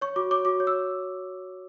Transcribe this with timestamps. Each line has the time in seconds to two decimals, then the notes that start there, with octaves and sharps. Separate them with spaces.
0.01 C#5 C#6
0.16 F#4 D6
0.31 C#5 D6
0.45 F#4 D6
0.60 C#5
0.67 E6